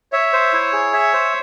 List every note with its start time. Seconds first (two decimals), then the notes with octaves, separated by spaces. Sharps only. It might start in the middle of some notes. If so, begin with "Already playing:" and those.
0.13 C#5 E5
0.33 C5
0.53 E4
0.73 G#4
0.93 E5
1.13 C5